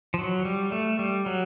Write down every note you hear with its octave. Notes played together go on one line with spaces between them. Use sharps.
F3
F#3
G3
A3
G3
F#3